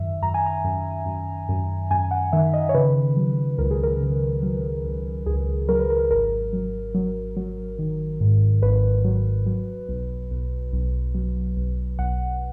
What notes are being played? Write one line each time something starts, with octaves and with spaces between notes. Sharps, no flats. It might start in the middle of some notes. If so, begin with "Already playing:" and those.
Already playing: F#2 D#3 E5
F#2 A#5
G#5
A#5
F#2
F#2
F#2
F#2 G#5
F#5
D#3 E5
D#5
C#5
C#3 B4
F#3
C#2 A#4
G#4
A#4
C#3
F#3
C#2
C#2 G#4
F#3 A#4
B4
A#4
G#1 A#4
F#3
F#3
F#3
D#3
G#2
G#1 B4
F#3
F#3
B1
B1
B1
F#3
B1
B1 F#5